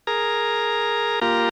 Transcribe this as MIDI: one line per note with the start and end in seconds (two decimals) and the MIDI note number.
0.07 1.20 68
0.07 1.20 70
0.07 1.20 82
1.22 1.49 58
1.22 1.49 65
1.22 1.49 67
1.22 1.49 70
1.22 1.49 82